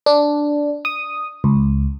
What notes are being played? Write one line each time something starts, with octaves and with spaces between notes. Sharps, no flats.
D4
D#6
C#2